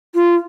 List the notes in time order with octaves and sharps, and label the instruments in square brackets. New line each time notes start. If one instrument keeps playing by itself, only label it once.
[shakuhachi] F4